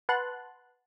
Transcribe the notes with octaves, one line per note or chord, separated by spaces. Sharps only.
B4 F#5 A5 C6 F#6